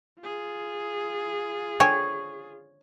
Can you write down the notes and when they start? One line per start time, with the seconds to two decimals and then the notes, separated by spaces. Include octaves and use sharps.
0.20 F4 G#4
1.80 D3 C#5 G5 G#5